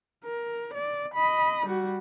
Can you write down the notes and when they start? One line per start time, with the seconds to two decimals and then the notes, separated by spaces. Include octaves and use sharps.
0.24 A#4
0.74 D5
1.14 D#5 B5
1.67 G3 F#4